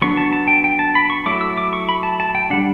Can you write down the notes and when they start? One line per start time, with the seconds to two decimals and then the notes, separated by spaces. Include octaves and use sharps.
0.02 F#3 B3 D4 C#6
0.17 A5
0.33 A5
0.48 G5
0.64 G5
0.79 A5
0.95 B5
1.10 C#6
1.26 F#3 A3 E4 D6
1.41 E6
1.58 D6
1.73 C#6
1.89 B5
2.03 A5
2.20 A5
2.35 G5
2.50 G3 D4 F#5